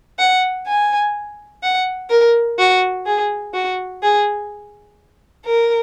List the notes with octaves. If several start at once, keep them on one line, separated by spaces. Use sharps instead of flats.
F#5
G#5
F#5
A#4
F#4
G#4
F#4
G#4
A#4